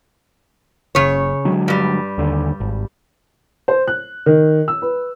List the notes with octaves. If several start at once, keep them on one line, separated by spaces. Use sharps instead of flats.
F#1 C#3 C#5
D3 F#3 G#3
G2 G3
D#2 D3
G#1
C5
F#6
D#3
E6
B4